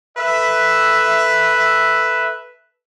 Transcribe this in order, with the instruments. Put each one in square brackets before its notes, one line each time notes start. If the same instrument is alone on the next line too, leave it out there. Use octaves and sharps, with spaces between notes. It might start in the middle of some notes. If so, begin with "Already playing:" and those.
[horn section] A4 B4 E5